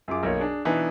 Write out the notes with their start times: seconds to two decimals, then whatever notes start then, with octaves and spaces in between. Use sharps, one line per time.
0.08 F#2 F4 G#4 D6
0.23 B1 A#3 C#5
0.40 D4 G#4
0.65 B2 E3 B3 D4 D#4